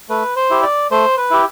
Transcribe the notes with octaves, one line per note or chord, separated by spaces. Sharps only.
A3 B4
C5
E4 G4
D5
A3 C5
B4
E4 G4